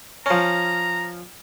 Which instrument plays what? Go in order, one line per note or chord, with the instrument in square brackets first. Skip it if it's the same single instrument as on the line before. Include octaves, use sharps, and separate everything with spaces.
[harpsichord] F3 C#4 [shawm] A#5